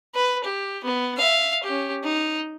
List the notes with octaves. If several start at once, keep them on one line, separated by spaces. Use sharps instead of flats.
B4
G4
B3
E5 F5
C#4 G4
D#4